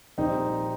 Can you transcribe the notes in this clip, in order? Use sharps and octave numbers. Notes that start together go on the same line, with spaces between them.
A#1 A#2 G3 C4 D#4